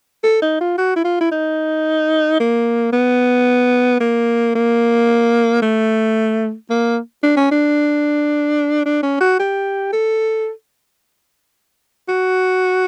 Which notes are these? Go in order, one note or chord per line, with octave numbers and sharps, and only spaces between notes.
A4
D#4
F4
F#4
E4
F4
E4
D#4
A#3
B3
A#3
A#3
A3
A#3
D4
C#4
D4
D4
C#4
F#4
G4
A4
F#4